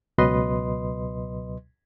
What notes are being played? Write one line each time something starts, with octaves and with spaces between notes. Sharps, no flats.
C#2 B2 F#3 B4 D#5 C6